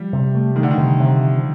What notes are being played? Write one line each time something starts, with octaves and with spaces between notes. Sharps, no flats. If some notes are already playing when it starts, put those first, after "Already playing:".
Already playing: F3 G3
C3
A3
D#3 A3
D3
D#3
C3
C3
F3